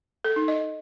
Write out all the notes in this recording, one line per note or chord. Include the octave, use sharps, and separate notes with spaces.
A4
D#4
D#5